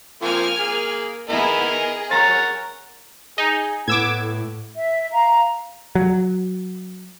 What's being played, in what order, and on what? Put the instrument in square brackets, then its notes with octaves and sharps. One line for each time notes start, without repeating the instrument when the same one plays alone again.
[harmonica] F3 A#3 C4 [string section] G#5 F6
[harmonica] A#3 G#4
[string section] B3 E4 G#4 [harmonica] A#4 D#5
[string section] G#4
[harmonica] A#4 C#5 F#5 [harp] A#5 A6
[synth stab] D#4 [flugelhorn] G#4
[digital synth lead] A2 [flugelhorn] B3 [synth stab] D6 E6 G#6
[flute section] E5
F5 A#5
[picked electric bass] F#3